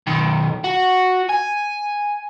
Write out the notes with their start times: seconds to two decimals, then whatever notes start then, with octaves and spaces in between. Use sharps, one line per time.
0.07 B1 D#3
0.64 F#4
1.29 G#5